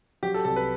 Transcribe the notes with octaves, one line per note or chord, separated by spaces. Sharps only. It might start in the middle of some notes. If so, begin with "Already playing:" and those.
F#3 G4
A4
C2 A4
B4